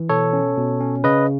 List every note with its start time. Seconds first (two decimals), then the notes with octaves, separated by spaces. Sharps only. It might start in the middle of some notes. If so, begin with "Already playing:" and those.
Already playing: E3
0.09 B2 A4 C#5
0.33 C#4
0.57 B2
0.81 C#4
1.04 C#3 B4 D#5